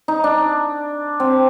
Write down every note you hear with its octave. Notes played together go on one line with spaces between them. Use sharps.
D#4
D4
C4